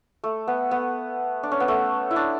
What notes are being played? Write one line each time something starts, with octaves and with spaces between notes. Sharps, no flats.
A3
B3
B3
D4
C#4
B3
A3
E4
D4